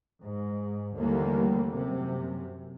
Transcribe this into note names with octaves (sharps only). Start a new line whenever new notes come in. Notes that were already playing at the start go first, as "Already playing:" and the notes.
G#2
D#2 D3 E3 G3 A3 A#3
F#2 C3